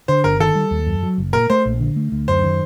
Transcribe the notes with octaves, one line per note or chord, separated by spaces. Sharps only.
D3 C5
G1 A#4
D#3 A4
G3
D#2
F#2
F#3
F#1
A#2 A#4
A3 C5
A#1
D3
A3
D2
F#2 C5
D#3